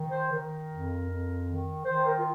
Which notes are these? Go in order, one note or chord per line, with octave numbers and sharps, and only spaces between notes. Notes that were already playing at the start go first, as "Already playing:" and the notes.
Already playing: D#3
C5
D#3 A#4
F2
F2
D#3
D#3 C5
A#4
F4